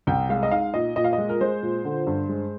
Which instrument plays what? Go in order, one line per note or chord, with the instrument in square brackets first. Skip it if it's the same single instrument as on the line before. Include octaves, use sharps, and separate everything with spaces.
[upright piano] C2 G5
G#3 F5
D#5
D#4 F5
A#2 D#5
A#2 D#5
F5
D#5
G#3
A#4
G#3 C5
A#2
D3
G2
G#3